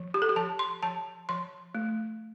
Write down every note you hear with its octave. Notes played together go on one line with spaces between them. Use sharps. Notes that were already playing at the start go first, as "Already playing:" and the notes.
Already playing: F3
G4
A4
G4
F3 A5
C6
F3 A5
F3 C6
A3